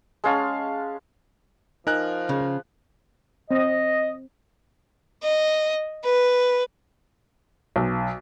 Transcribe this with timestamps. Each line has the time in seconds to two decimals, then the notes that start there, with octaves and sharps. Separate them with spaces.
0.24 G#3 C#4 F5 A5
1.87 F3 D#4 A#4 G#5 F#6
2.29 C#3
3.51 C4 D#5
5.23 D#5
6.04 B4
7.76 B1